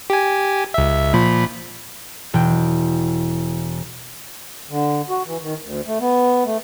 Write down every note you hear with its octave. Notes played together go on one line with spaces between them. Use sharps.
G4 G#5
C#2 E5
A#2 F3 B5
E1 G5
D3
F#4
E3
D#3
D2
A3
B3
A3